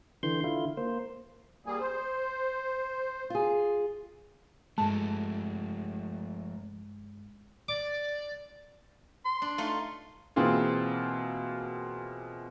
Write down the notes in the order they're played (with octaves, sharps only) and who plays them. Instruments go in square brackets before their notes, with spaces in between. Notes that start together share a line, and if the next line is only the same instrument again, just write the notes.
[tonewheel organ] D3 E3 C6 G6
D3 E4 F4
A#3 C5
[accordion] G3 A#3 G#4
C5
[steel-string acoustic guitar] F4 G#4
[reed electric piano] G2 G#3 [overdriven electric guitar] F3 A3 [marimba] A5
[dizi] D5 [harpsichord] D6
[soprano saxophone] C6
[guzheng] D4
A3 D#4 F4
[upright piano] B2 E3 A#3 C4 F4 G#4